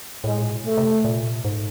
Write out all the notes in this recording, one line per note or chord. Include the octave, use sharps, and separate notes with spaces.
A2 G#3
A#2
B2
A3
C3
A#2
G#2